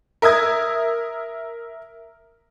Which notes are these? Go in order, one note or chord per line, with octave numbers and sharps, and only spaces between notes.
A#4 E5 D#6 G#6